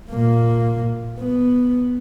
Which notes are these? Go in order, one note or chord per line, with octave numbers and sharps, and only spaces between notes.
A#2 A#3
B3